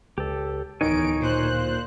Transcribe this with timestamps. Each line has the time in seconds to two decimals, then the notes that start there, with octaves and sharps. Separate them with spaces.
0.18 C#2 G4 A4
0.81 D1 E2 D#3 D#4 C#5 G#5 D7
1.19 A#2 C5 F#6